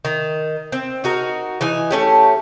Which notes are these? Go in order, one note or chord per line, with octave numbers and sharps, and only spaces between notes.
D#3
C4
D#4 F#4 A#4
E3 D#4 G#5
A3 C#4 G4